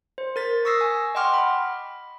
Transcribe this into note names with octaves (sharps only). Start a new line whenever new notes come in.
C5
A#4 A6 B6
C#6 D#6 E6 A#6 C7
G#5
D#5 F#5 G5 C6 D6 F6
B5